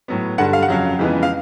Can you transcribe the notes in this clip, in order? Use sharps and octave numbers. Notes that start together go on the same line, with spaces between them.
A2 F#3 B3
G2 D3 G3 F#5
F5
F#5
F2 C#3 F#3 F5
F2 C#3 E3 G#3 B3
F5